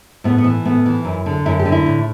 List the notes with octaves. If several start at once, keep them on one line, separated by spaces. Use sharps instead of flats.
A2 B3
B3
E3
A2 B3
E3
F#2
D3
F#2 E4
G4
D3
E4
A2